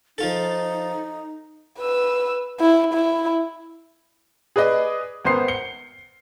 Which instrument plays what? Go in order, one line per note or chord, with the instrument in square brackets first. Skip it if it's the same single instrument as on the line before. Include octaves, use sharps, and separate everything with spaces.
[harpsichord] F3 F4 A4 [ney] D#4
[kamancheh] B4 E6
E4
E4
[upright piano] G#4 B4 D5 D#5
G#1 B3 A#4 C5 C6 C7
C7 C#7 G7